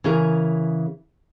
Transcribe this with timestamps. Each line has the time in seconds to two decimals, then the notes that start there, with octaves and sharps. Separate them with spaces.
0.04 C#3 E3 G#4 A#4